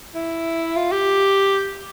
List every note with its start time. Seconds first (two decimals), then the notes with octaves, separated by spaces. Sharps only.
0.15 E4
0.76 F4
0.92 G4